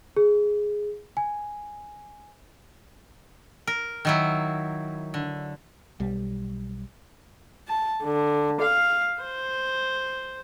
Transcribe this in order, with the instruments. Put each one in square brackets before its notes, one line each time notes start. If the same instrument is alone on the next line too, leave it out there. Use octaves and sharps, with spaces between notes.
[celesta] G#4
G#5
[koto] A#4
D#3 F#3 E4
D3
[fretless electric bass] B1 G3
[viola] A5
D3
F5
C5